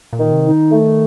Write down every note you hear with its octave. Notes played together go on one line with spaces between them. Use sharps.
A#2
D#3
C3
D#4
D#3
A3